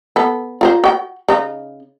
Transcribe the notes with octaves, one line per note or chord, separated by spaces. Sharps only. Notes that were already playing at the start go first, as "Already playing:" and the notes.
B3 A4
F4 A#4 C5
F#4 G5
C#3 D#4